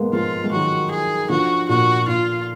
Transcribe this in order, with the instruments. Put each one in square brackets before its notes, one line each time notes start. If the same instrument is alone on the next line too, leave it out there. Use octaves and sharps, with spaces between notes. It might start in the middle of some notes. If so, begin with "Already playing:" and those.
Already playing: [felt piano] G#3 A#3 B3
[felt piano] F3 G#3 [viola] F4
[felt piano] G#3
[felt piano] D#3 F#3 [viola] F#4
[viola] G#4
[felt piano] D3 F3 [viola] F#4
[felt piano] A#2 [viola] F#4
[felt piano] A#2 [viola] F4